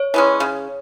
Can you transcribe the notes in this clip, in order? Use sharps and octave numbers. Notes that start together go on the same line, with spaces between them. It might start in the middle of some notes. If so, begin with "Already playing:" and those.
Already playing: C#5
E3 G#3 C#4
C#3